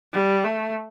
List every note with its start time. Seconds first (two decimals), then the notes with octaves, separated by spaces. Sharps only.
0.13 G3
0.44 A3